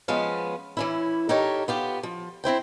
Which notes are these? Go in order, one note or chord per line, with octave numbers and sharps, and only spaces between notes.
F3 G#3 B3 C#4 F5
E3 C#4 E4
D#4 G4 A4 A#4 C#5
B3 F4 G4
F3
C4 E4 C5 G5